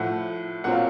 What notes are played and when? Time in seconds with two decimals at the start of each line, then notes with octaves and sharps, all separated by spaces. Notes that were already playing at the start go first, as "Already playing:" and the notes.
Already playing: A2 F3 A3 F#5
0.64 A#2 F#3 C4 F#5
0.72 F5